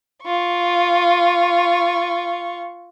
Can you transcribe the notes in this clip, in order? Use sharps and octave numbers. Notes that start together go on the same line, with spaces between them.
F4 C#6